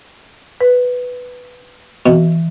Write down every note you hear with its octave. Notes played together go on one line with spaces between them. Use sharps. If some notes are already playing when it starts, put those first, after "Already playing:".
B4
B2 E3